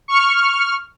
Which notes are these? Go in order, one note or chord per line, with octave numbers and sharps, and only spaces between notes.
C#6 F6